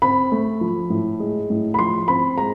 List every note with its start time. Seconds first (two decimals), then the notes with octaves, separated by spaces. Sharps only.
0.02 C4 B5
0.32 A3
0.61 F3
0.90 A2
1.20 G#3
1.50 A2
1.74 B5
1.79 F3 C6
2.08 C4 B5
2.38 G#3 A#5